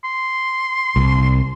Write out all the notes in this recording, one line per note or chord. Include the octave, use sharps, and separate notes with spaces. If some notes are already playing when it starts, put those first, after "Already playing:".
C6
C2